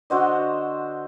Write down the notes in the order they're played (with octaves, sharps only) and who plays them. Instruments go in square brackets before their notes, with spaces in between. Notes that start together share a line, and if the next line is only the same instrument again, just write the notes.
[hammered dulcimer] D3 F#4 C5 D#5